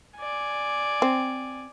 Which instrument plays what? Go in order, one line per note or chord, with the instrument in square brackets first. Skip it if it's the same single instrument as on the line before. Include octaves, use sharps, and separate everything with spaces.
[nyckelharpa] D5 G#5
[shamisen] C4